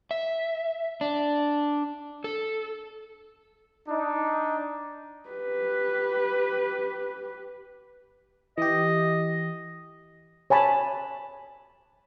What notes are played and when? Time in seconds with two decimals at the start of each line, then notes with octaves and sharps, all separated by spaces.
0.11 E5
1.01 D4
2.24 A4
3.88 D4 D#4
5.29 G4 B4
8.58 E3 G4 D#5
10.50 C#5 G#5 A5 B5